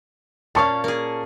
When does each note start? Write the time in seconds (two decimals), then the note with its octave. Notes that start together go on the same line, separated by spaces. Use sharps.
0.55 A#2 C#4 F5 A5 C#6
0.84 A#3 G#4